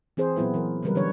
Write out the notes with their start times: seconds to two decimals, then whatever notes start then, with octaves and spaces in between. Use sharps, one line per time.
0.17 E3 C4 G#4 C5
0.36 A#2 F#3 B3 E4 B4
0.54 E3 F#3 A#4
0.83 C#3 E3 F#3 G3 A#4 B4
0.95 D3 E3 F#3 D4 B4 C#5